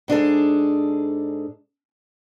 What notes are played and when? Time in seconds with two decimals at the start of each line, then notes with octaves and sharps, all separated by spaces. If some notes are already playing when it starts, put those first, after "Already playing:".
0.08 G#2 D4 G#4 A4